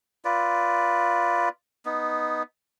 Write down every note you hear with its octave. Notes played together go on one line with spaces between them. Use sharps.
F4 B4 D5
B3 D#4